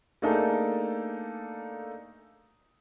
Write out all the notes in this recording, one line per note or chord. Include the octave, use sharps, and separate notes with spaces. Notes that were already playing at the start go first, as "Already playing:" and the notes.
A3 A#3 D4 D#4 G#4 A4